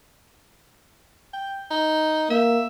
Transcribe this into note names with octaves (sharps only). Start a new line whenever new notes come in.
G5
D#4
A#3 E5